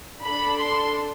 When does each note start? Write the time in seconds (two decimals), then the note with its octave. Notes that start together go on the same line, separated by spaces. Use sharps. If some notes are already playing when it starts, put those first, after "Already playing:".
0.21 D4 A4 B5
0.60 C6